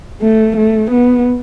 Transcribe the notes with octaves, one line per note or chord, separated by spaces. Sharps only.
A3
A3
B3